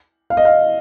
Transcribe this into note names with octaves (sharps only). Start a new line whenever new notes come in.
F5
D#5
F5